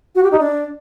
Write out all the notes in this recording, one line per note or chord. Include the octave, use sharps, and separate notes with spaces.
F#4
G4
D#4
D4